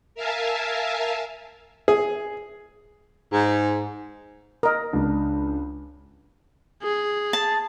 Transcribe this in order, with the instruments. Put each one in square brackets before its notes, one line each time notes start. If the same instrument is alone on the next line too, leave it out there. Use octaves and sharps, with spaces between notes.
[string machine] A#4 E5 F5 G#5 A5
[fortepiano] G#4
[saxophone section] G#2
[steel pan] A#4 D#5
[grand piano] C#2 D4
[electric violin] G#4
[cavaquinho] A5